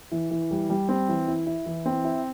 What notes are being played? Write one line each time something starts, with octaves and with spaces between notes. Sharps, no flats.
E3
E3
G3
G3
C4
E3
E4
E4
E3
C4
E4